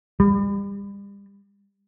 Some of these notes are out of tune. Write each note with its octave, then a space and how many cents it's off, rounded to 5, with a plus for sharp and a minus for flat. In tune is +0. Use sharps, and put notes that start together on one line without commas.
G3 +35